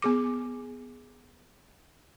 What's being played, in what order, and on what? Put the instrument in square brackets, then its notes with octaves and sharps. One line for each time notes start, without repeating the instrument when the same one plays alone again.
[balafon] B3 G#4 D6